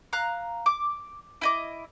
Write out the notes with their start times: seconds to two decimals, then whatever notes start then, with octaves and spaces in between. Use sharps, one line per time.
0.13 F5 A#5 F#6
0.66 D6
1.41 E4 D#5 D6